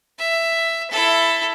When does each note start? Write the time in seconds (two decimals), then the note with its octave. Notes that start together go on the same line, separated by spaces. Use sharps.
0.18 E5
0.91 E4 A4